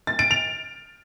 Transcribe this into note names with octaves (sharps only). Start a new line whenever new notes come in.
A6
D7
F7